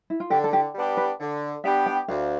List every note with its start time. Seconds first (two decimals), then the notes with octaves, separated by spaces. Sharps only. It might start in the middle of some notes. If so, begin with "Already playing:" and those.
0.10 E4
0.20 F4
0.30 D3 G4
0.44 A4
0.53 G4
0.75 G3 B3 D4 G4
0.97 B4
1.20 D3
1.64 G3 B3 D4 G4 E5
1.86 G5
2.08 D2 F5